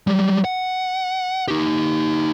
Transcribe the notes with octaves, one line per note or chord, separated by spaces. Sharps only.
F#3 G3
F#5
D#4 G4